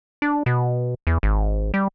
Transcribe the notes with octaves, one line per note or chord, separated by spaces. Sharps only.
D4
B2
E2
G#1
G3